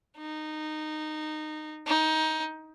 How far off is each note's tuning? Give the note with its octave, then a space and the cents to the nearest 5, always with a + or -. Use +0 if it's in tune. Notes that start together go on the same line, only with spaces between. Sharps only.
D#4 -15
D#4 +15